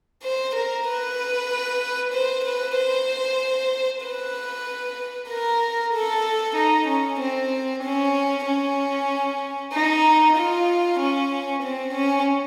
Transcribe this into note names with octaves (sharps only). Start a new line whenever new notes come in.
C5
A#4
B4
C5
B4
C5
B4
A#4
A4
D#4
C#4
C4
C#4
C#4
D#4
F4
C#4
C4
C#4